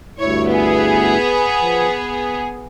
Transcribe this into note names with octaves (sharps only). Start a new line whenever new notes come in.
D2 G2 E4 C#5
B3 G#4
F3
G#5